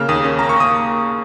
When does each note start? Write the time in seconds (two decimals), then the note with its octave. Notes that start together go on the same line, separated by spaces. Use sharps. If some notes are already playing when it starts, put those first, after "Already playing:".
Already playing: C#3 A#3 F6
0.09 D#2 D#6
0.24 C#4
0.39 A#3 A#5
0.49 C#6
0.56 A#3 D#6